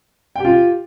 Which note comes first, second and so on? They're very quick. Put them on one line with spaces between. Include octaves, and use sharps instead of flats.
G5 G4 F4